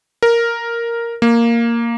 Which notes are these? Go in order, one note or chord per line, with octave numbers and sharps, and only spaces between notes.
A#4
A#3